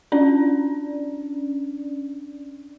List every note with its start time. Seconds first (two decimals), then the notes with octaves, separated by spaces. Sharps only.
0.12 C#4 D4 D5